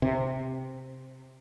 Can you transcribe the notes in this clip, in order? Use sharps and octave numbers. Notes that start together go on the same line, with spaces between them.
C3